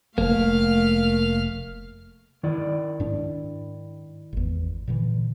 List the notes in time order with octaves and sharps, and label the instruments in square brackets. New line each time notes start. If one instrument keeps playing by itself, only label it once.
[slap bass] F1 [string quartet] A3 [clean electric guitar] A#3 [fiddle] F5 F6
[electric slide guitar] D#3 E4 D5
[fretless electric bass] G#2 D4
G#1 E2
A#2 D3 E3